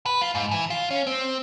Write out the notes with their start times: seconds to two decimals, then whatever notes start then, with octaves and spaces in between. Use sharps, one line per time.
0.06 B4
0.21 F4
0.35 G#2
0.51 E3
0.70 F4
0.91 C#4
1.07 C4